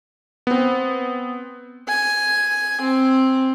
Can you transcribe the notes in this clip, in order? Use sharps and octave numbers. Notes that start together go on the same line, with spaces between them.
B3 C4
G#5
C4